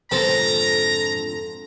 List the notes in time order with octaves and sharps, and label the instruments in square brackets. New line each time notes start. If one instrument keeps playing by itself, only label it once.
[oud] F2 G#2 D3 [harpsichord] C4 A4 [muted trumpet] A#5